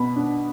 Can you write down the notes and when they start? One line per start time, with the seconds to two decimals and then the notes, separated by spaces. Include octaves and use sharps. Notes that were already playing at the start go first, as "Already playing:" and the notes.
Already playing: B2 B3 B5
0.16 D4